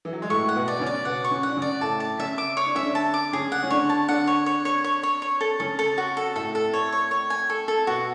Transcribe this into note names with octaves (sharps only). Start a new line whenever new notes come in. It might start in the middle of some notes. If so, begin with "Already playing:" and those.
E3
F#3
G#3
A2 A3 C#6
A3 F#5
B2 B3
D5
C#3 C#4
D5
B2 B3 F#5
C#6
C#3 C#4
D4 F#5
C#3 C#4
D5
A2 A3 A5
A5
C#3 C#4 E5
D6
C#5
D4
C#4 E5
D3 D4
A5
D6
C#3 C#4 G#4
F#5
C#4
D3 D4 C#5
A5
D3 D4 F#5
C#5
C#5
C#5
C#5
C#5
C#5
A4
C#3 C#4 A4
A4
F#4
A4
A2 A3 A4
A4
C#5
C#5
C#5
G#5
A4
A4
B2 B3 F#4